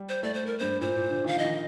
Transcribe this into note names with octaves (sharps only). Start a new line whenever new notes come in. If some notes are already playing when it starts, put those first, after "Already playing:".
Already playing: G3
C5
A3 D5
C5
A#4
G2 C5
A#2 C5
A#2
D3
D#3 F5
F3 D#5
D#3